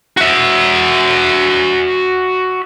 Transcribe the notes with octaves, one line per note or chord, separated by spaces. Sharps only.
F#4 E5